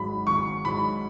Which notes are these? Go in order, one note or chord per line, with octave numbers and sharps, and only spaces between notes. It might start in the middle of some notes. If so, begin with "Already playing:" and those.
Already playing: G#1 G#2 F#3 B5
G#1 C#6
G#2 F#3 B5